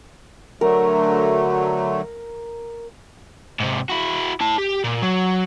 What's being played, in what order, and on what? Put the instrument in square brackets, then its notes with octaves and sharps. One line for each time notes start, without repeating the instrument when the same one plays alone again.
[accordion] D3 F#3 A3 [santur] A#4
[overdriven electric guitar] G#2 C3
E4 F#4
E4 A5
G4
A#2
F#3